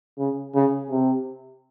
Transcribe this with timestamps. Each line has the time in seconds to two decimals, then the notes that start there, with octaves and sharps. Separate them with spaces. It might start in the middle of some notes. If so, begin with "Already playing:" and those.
0.18 C#3
0.55 C#3
0.90 C3